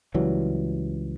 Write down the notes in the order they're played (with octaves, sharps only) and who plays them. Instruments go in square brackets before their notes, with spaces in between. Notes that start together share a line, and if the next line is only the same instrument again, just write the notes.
[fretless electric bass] C#2 E3 F#3 G3